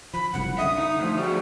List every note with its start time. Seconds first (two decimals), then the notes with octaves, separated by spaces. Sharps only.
0.14 F3 B5
0.33 F#1 C2 F#2 F#5
0.58 D3 E5 D#6
0.78 D#4
1.00 F3 A3
1.17 G3 A3 F#4